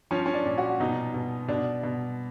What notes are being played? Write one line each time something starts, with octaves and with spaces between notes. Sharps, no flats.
F3 C#4
C#4
D4
A#2
F#4
B2 D#4
B2
B2 D4
B2